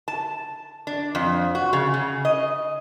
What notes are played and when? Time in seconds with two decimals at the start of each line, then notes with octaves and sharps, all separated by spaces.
0.08 A5
0.87 D4
1.15 F2
1.55 F#4
1.73 C#3
1.94 C#3
2.25 D#5